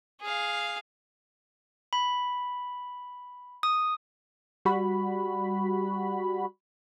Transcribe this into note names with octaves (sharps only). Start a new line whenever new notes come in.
G#4 F5
B5
D#6
G3 F#4 B5